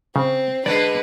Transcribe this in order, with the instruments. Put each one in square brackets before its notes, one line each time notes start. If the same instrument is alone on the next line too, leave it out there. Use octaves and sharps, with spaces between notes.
[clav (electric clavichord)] C#3 [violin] C4
[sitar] D3 G#3 [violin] B4 [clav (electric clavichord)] D5